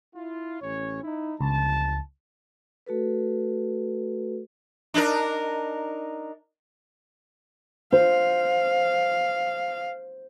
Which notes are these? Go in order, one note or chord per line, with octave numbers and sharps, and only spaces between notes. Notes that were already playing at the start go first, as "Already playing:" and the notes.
E4 F4
A1 C#4 C#5
D#4 E4
G1 C#2 F3 A5
A3 F#4 A4 B4
D4 D#4 A#4
C5 F5